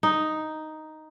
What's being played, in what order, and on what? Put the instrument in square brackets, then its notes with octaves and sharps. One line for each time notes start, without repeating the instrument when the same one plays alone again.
[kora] D#4